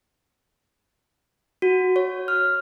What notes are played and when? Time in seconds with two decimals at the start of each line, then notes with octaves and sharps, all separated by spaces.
1.62 F#4
1.96 C#5
2.28 F6